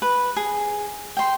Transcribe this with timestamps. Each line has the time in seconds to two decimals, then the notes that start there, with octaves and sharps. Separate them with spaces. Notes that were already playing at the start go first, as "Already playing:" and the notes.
0.02 B4
0.37 G#4
1.17 G5 C6